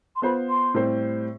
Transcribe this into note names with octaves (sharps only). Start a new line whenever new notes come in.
C6
B3 F4 C5 B5
C6
A2 G3 C4 G4 C5